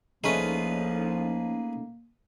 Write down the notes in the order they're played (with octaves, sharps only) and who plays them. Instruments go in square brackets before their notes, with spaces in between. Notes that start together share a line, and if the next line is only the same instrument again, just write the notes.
[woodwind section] C2 F3 [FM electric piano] A3 C#4 D#4 [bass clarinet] A#3 [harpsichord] G#4 B4